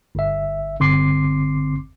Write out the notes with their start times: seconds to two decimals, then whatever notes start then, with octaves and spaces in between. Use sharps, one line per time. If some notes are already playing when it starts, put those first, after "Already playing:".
0.15 G1 E5
0.80 G1 D3 C4 C6 D6 C7